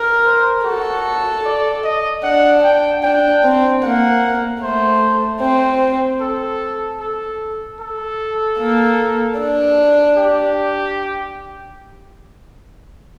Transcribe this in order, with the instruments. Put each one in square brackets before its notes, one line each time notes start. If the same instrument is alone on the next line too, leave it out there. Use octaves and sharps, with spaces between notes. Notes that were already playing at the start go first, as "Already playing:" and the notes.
Already playing: [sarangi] A#4
[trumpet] C5
[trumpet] F#4 [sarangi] A4
[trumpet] D5
D#5
[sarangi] D4 [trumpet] F#5
[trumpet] G5
[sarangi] D4 [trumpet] G5
[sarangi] C4
[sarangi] A#3 [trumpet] F#5
[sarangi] A3 [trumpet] C5
[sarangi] C4 [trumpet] C5
[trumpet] A4
A4
A4
[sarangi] A#3
D4
[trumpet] G4